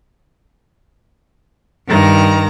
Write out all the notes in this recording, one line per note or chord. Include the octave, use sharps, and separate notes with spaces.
G2 D#3 A#5